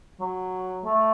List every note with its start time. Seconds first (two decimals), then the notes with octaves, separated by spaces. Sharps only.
0.20 F#3
0.85 A3